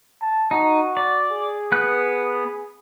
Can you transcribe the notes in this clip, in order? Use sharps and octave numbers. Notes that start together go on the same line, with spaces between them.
A5
D#4 F#4
D5
G#4
B3 F#6